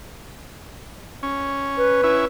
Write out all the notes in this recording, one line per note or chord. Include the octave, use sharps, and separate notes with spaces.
C#4
B4
C#4 E4